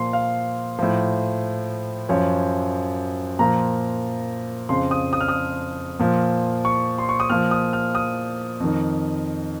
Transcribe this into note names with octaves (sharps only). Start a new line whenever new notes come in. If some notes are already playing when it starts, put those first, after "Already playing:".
Already playing: A#2 F3 C6
F5
A2 F3
F#2 F3 C#5
A#2 F3 A#5
F2 C#3 F3 C6
D#6
D#6
F6
D#6
A#2 F3
C#6
C6
C#6
D#6
A#2 F3 F6
D#6
F6
D#6
F2 D#3